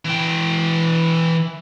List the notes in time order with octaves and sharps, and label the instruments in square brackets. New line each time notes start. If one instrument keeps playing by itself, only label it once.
[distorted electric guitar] E3 G5